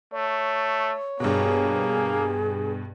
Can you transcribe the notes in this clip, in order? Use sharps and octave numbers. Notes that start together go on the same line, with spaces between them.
A3 C#5
G2 B2 A#3 G#4